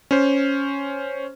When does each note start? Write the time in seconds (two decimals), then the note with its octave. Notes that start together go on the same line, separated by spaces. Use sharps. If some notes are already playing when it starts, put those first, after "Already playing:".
0.11 C#4 C5